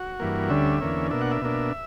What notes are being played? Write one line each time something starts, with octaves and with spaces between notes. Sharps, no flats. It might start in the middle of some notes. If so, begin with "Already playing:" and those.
Already playing: F#4
G2 E3 A#3
D2 D3 G3 C#4 E5
E2 D3 A#3 C#4
B2 A#3 D4 E5
F#5
E5
B2 A#3 D4